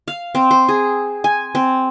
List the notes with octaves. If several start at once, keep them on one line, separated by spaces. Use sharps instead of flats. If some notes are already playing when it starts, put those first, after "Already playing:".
F5
C4
C5
G#4
G#5
C4